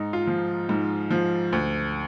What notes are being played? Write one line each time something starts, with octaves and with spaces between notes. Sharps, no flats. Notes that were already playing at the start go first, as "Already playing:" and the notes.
Already playing: G#2 D#4
F4
F3
G#2
F3
D2